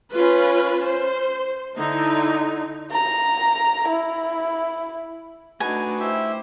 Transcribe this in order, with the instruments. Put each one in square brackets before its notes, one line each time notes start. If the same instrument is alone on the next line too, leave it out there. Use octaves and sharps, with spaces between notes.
[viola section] C#4 F4 B4
C5
D3 D#4 E4
[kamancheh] A#5
E4
[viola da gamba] A3 D4 D#4 [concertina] F#4 B4 [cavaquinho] G#5
[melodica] E4 G4 E5 [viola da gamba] C5